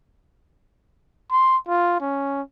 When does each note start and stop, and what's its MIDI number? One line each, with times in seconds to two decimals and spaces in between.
1.31 1.57 84
1.68 1.98 65
2.01 2.42 61